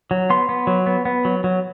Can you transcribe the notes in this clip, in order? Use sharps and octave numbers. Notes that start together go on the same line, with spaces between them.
F#3
B3 C6
B3
F#3
B3
B3
F#3
F#3